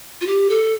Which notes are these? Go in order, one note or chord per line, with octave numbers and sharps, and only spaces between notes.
F4
G4
A4